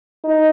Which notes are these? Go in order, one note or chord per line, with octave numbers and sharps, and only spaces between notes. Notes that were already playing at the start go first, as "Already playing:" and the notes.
D#4